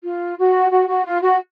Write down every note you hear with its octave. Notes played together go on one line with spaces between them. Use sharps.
F4
F#4
F#4
F#4
F4
F#4